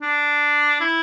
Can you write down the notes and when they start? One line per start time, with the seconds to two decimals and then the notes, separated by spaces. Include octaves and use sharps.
0.02 D4
0.81 E4